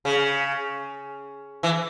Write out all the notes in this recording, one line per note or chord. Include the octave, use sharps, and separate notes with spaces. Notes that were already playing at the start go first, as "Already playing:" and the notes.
C#3
E3